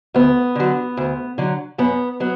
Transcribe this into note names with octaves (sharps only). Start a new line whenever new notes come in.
D2 B3
D3 F#3
D2
D3 F#3
F#2 B3
F#3 B3